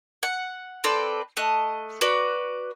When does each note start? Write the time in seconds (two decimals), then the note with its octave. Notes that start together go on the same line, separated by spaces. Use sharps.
0.23 F#5
0.84 C4 A4 B4 D5
1.37 A3 D#5 F#6
2.01 F#4 B4 D5